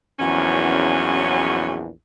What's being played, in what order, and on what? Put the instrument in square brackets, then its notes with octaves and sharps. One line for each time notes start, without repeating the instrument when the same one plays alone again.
[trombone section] A#1 E2 [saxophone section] F#3 C#4